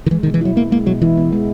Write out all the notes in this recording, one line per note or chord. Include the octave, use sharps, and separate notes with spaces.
D#3
E3 G#3
D#3
B2
E3
F#3 E4
A#3 B3
G#3 A#3
B2 F#3
E3 E4
B3
G#3